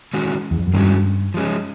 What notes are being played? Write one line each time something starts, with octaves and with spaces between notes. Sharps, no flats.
D#3 G#3 C#4 F#4
E2
F2
F#2
G2 D#3 G#3 C#4 F#4
F3 G#3 C#4